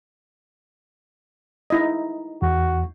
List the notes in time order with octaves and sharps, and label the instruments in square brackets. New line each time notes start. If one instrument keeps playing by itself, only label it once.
[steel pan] D#4 E4 D#5
[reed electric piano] E2 [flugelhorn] F#4